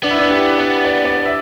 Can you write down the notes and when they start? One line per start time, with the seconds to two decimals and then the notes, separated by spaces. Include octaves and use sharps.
0.03 B3 D4
0.11 E4
0.19 D4
0.31 G4
0.58 D5
0.85 D5
1.05 D5
1.25 E5